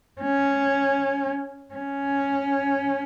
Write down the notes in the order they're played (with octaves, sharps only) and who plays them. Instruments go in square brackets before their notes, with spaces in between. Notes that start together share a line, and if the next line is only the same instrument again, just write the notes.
[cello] C#4
C#4